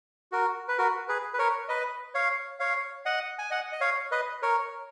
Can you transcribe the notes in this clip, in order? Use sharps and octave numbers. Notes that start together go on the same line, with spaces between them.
F#4 A#4
B4
F#4 A#4
G#4 B4
B4
A#4 C#5
B4 D#5
C#5 F5
C#5 F5
D#5 F#5
G#5
D#5 F#5
D#5
C#5 F5
B4 D#5
A#4 C#5